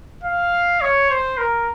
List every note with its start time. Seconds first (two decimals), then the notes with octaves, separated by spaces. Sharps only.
0.24 F5
0.81 C#5
1.10 C5
1.38 A#4